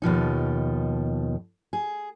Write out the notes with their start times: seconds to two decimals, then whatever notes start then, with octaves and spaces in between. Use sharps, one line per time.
0.02 D#2 B2 F3 D#4
1.73 G#4